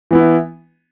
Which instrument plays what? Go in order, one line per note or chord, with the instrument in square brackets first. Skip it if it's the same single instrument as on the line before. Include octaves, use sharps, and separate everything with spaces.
[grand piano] E3 B3 E4